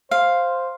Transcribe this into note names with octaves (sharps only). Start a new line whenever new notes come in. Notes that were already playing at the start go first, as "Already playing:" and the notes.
C5 F5